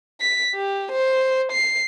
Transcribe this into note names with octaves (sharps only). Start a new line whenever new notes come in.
B6
G4
C5
C7